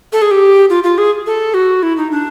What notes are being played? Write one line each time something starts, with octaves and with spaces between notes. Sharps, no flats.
A4
G#4
G4
F4
F4
G#4
A4
F#4
E4
D#4
D4